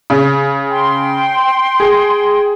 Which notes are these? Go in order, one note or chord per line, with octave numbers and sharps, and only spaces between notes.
C#3
G5 C6
G#4